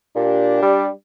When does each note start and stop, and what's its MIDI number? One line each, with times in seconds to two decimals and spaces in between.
0.16 0.59 46
0.16 0.87 62
0.16 0.87 67
0.62 0.89 55